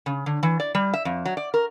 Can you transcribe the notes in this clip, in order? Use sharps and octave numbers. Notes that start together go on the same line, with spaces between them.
C#3
D3
E3
D5
G3
E5
F2
F#3
D5
A#4